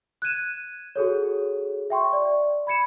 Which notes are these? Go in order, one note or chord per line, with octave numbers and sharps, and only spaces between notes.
F#6 G#6 D#7 E7
F#4 G#4 A4 C#5
E5 G5 C6 C#6
D5
B5 G#6 C#7 E7